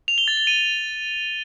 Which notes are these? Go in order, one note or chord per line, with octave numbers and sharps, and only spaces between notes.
F7
G7
A6
G7
D#7